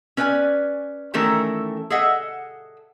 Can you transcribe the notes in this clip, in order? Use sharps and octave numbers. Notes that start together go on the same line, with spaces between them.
C#4 B4 D5 D#5 G#5
D#3 E3 A3 C#4 A4 A#4
G#4 A4 D#5 E5 F#5